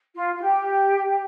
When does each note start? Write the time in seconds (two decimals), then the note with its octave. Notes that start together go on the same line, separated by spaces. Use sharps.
0.14 F4
0.34 F4
0.42 G4